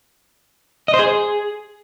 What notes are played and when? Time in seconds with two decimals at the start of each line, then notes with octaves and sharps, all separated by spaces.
0.88 D#5
0.94 C5
0.99 G#4